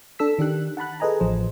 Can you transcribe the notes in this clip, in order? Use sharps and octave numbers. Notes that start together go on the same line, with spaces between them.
D4 A4 E6 B6
D#3 D4 G4 F#6
F#5 A5 B5 F#6
G#4 A4 B4 D#5 G#5 A#5
A1 F3 C5